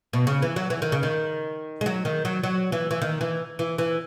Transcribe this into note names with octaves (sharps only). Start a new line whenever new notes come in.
B2
C#3
E3
F#3
E3
D#3
C#3
D#3
G#3
F#3
D#3
F#3
F#3
E3
E3
D#3
E3
E3
E3